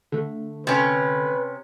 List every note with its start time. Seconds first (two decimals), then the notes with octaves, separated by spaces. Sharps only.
0.12 D3 A3
0.67 C3 C#4 B4